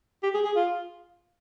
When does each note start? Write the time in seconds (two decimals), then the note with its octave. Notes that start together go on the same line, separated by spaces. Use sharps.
0.23 G4
0.35 G#4
0.45 G#4
0.56 F4